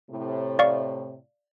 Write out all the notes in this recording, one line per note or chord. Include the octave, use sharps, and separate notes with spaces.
A2 C3
D5 F5 C#6